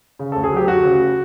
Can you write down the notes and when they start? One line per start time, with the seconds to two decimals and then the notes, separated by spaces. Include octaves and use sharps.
0.19 C#3
0.32 D2 A4
0.44 G#4
0.52 F#3 G4
0.68 D2 F#4
0.84 C#3